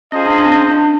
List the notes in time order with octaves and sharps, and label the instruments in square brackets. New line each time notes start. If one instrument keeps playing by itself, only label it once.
[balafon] C#4 [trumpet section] F4 G#4 C5 D#5
[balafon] D4
D4
C4
C#4
D4